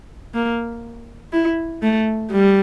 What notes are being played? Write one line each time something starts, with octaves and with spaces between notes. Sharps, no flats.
A#3
E4
A3
G3